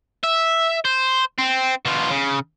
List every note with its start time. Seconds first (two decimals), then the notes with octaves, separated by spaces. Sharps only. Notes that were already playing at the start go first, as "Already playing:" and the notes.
0.24 E5
0.85 C5
1.39 C4
1.85 B2 F4
2.11 C#3